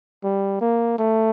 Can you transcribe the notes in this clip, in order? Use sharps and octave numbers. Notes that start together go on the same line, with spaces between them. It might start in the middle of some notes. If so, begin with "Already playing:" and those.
G3
A#3
A3